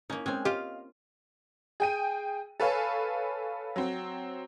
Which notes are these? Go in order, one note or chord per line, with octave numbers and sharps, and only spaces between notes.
A#3 C#4 D#4
G#3 C4 C#4 G5 G#5
F4 G4 D#5 F5
G#4 G5 D#7
A4 B4 C#5 F5 G#5
F#3 C4